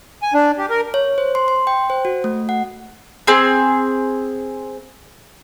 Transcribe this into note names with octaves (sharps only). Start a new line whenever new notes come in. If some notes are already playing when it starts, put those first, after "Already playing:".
G#5
D4
G4
A#4
C#5
C5
C6
C6
G5
C5
F#4
A3
F#5
C4 G#4